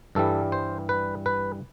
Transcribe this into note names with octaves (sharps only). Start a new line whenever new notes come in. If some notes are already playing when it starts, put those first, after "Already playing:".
G2 E3 G3 A4
C5
B4
B4